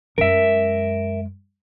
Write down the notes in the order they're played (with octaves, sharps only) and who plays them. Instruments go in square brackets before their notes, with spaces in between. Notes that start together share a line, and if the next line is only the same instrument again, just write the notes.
[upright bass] F#2 G#3 [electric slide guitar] A#4 E5